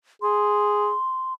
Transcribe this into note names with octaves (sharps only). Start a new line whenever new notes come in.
G#4 C6